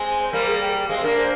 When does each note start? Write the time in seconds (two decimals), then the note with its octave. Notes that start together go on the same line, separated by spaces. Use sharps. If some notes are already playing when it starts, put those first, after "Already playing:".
Already playing: G#3 C4 G#5
0.22 C5
0.33 G3 A#3 A#4
0.47 G#4
0.61 G5
0.89 G#3 C4 F5
0.98 G#4
1.03 A#3 D4 A#4
1.17 C5